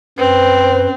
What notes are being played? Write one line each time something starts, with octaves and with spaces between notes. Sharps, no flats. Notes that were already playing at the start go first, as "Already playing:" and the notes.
F#2 C4 B4 C5